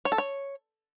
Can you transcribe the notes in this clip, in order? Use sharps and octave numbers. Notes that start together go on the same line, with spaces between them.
C#5
A4
C#5